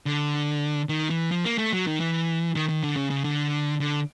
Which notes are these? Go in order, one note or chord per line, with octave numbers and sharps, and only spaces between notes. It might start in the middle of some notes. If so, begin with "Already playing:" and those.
D3
D#3
E3
F3
A#3
A3
F#3
D#3
E3
D#3
D#3
D3
C#3
C#3
D3
D3